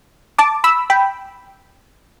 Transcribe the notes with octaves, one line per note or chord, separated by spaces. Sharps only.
A5 D6
B5 E6
G5 B5